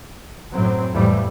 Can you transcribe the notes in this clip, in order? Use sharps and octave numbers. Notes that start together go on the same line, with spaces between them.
F#2 A2 F#3 C4
F2 A2 E3 G3 A3